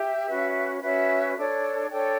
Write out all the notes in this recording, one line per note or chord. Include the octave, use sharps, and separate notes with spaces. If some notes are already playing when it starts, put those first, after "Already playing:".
Already playing: G4 E5
C#4 F#4 B4
C#4 F#4 B4 E5
D4 A4 C#5
D4 A4 C#5 G5